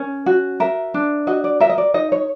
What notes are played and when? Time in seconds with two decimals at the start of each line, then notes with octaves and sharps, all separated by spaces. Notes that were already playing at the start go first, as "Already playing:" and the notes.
Already playing: C#4 A#4
0.26 F#4
0.60 A#4 E5
0.94 D4
1.27 F#4 D#5
1.44 D5
1.60 A#4 E5
1.69 D#5
1.78 D5
1.94 D#4 D#5
2.12 C#5